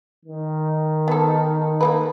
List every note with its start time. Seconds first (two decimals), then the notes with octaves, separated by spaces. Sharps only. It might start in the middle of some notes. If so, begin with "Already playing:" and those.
0.25 D#3
1.08 B3 A4
1.81 A3 A#3 B4